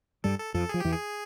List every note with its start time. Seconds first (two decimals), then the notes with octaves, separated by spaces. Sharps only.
0.24 G2 G3 A4
0.39 A4
0.54 F2 F3 A4
0.69 F3 G#4
0.80 E2 E3 G4
0.92 G#4